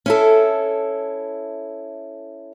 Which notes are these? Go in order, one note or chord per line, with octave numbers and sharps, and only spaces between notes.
C#4 E4 A4